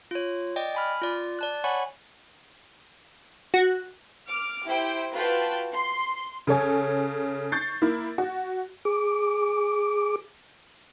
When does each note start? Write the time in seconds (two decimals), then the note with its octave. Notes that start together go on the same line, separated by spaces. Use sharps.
0.11 F4 C#5
0.56 D5 D#5 G5
0.75 G#5 B5 F6
1.02 F4 D5
1.39 D5 A5 F#6
1.64 C#5 F#5 G#5 B5 C#6
3.54 F#4
4.28 D6 F6
4.66 E4 G4 C5 G5
5.13 F4 F#4 B4 G5 A5
5.73 C6
6.47 C#3 A4 C#5 G#5
7.52 C#6 G6 A6 C7
7.82 A#3 E4
8.18 F#4
8.85 G#4 D6